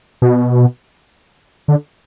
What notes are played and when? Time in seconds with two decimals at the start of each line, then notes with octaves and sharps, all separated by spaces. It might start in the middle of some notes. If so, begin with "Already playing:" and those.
0.22 B2
1.68 D3